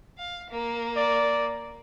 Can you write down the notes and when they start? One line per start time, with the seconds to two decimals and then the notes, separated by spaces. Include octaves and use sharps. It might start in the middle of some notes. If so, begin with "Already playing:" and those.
0.18 F5
0.51 A#3
0.96 D5